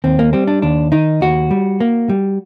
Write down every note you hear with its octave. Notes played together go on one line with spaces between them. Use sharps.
D#2 C4
A#3
G3 C4
D4
D#2 D4
D#3 D#4
D#2 F#4
G3
A#3
G3